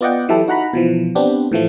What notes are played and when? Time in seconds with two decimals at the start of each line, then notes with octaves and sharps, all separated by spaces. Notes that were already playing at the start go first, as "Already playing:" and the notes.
0.01 B3 F4 D5 D#5 F#5 G5
0.29 E3 F#3 E4 G4 A4
0.47 D#4 F#4 F#5 A#5 B5
0.73 B2 E3 F3
1.15 B3 C4 D4 G4
1.52 A2 E3 F3 A3